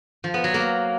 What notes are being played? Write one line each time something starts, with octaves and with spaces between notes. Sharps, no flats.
F3
B3
F#3
A#3